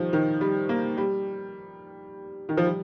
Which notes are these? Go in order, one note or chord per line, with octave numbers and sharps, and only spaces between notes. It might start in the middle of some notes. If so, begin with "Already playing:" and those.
Already playing: D#3 F3 G3
D#3
G3
A#3
G3
D#3
F3
G3